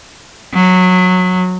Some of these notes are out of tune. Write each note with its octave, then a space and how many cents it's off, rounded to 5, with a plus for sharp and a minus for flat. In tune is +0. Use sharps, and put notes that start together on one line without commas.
F#3 -15